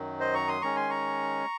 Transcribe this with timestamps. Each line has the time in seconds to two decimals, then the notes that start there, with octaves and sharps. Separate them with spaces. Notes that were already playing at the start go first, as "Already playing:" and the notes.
Already playing: F#2 D#3 F#3
0.20 C5 D#5
0.34 A#5 C#6
0.47 C6 D#6
0.61 D#3 G#3 C#4 A#5 C#6
0.76 G#5 C6
0.89 A#5 C#6